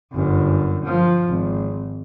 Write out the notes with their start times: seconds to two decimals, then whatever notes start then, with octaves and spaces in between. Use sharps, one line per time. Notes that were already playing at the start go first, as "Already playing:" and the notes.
0.12 G1 F#2
0.85 F3
1.26 G#1